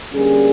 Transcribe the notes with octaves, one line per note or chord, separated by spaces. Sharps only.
D3 G3 A#3 C#4 G#4